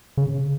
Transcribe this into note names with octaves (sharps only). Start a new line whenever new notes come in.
C#3